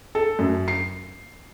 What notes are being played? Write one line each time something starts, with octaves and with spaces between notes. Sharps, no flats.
A4
F#2
C7